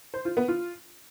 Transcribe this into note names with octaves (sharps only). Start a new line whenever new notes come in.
C5
F4
B3
F4